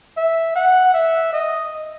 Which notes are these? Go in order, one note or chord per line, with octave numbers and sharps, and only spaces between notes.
E5
F#5
E5
D#5